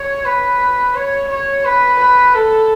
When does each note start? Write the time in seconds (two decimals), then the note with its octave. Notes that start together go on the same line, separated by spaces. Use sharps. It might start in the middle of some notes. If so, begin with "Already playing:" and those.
Already playing: C#5
0.25 B4
0.95 C#5
1.30 C#5
1.65 B4
2.00 B4
2.35 A4